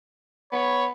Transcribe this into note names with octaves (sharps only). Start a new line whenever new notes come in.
B3 C#5 B5